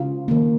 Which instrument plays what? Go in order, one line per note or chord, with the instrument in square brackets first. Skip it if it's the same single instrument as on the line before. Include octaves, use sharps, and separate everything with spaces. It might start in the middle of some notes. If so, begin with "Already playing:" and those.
Already playing: [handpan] C#3 G#3 F4
D#3 A#3